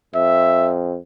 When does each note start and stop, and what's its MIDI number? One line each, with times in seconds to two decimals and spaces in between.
0.15 0.97 41
0.15 0.74 76